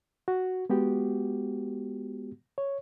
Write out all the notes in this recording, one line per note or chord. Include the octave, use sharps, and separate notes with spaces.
F#4
G#3 B3 F#4 G4
C#5